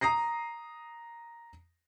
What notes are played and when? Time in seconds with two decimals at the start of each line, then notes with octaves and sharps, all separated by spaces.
0.01 A#5 D#6 A#6 C7